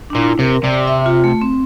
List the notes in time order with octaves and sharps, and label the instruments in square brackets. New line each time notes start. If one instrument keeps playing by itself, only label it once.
[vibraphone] D4
[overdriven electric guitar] A#2 [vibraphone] E4
[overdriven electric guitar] C3 [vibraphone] A#4
[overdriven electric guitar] C3 [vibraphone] D5
[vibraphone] E5
F4
A3
C4